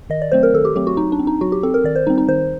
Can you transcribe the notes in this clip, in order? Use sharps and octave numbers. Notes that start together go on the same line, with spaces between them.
D#3 D#5
D5
F#3 A3 C4 C5
A#4
D#3 A4
G4
F#3 A3 C4 G4
F#4
F#3 D#4
D4
C4
D#4
F#3 F#4
G4
C4 A4
A#4
D#3 D5
C5
G3 C4 D#4
D#4
D#3 C5